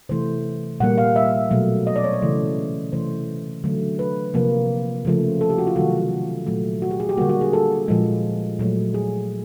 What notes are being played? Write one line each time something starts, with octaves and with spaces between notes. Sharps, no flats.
C3 E3 A3 C5
A#2 G3 A#3 F#5
F5
E5
B2 F#3 A3
D#5
D5
C#5
C5
C#3 E3 A3
C3 E3 A3 C5
D3 F#3 A3
B4
C3 F3 A#3
C#3 F3 A3
A4
G4
F#4
F4
C3 D#3 F#3 A3 F#4
A#2 F#3 A3
F#4
G4
G#4
G4
D3 G3 A#3 F#4
F#4
G#4
A4
A#2 F3 G#3
A#2 F#3 A3
G#4